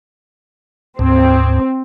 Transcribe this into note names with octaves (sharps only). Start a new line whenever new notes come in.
D2 G#2 C4